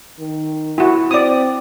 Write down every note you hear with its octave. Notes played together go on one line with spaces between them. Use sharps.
D#3
E4 F#4
C4 D5 D#6